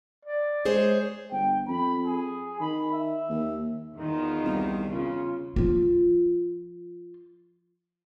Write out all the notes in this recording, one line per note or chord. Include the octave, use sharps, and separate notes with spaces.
D5
G#3 G#4 C5 C#5
G1 G5
F2 B5
G#4
D#3 B5
E5
D#2
E2 D#3 D#4 F4
C2
C#3 F4
F3 F4